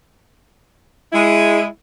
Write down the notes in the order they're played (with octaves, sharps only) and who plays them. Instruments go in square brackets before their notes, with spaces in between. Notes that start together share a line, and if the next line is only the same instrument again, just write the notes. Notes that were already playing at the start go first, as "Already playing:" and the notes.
[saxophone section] G#3 E4